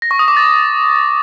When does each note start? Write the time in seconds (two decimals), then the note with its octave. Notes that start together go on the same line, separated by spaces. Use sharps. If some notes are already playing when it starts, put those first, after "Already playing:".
0.02 A#6
0.11 C#6
0.19 D#6
0.28 D6
0.37 A6